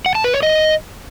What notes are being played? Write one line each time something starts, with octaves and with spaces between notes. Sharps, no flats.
F#5
A5
B4
C#5
D#5